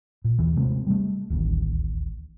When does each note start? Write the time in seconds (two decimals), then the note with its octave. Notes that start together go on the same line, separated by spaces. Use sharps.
0.24 A#2
0.39 D#2 E3
0.56 C3 G#3 A3 C4
0.87 G3 A3
1.30 D1 A1 D#2